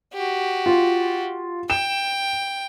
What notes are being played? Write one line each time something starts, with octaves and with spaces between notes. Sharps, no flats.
F#4 G4
F4
G5 E7